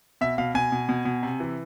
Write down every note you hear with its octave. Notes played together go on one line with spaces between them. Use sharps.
B2 E5
B2 F5
B2 G#5
B2
B2
B2
C3
E3